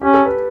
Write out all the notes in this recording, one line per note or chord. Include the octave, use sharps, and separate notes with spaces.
C#4 G4
A4
B4